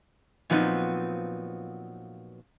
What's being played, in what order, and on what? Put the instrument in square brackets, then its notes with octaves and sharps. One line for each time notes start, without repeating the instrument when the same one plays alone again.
[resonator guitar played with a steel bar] A#2 F3 F#3 B3 C4 D#4